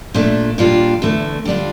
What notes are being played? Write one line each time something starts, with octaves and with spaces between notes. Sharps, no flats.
A#2 A3 D4
A#2 G3 D4 F4
E2 D3 A3
D3 G3 D4 F4